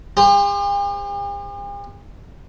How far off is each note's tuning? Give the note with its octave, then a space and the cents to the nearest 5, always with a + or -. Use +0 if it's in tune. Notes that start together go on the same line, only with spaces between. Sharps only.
G4 +45 C5 +0